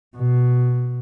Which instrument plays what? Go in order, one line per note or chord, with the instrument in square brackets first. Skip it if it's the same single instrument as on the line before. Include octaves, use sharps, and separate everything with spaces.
[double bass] B2